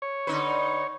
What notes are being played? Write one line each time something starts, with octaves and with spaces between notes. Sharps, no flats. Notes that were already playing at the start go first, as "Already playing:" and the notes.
C#5
D3 D#4 B4